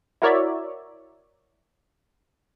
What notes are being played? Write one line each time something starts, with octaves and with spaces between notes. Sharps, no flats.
E4 F#4 A#4 C#5 D5 E5